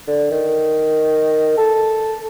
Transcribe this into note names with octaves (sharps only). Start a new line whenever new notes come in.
D3
D#3
A4